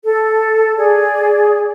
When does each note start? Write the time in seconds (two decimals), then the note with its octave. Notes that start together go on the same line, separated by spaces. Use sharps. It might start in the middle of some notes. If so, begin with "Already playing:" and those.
0.03 A4
0.77 G#4 D5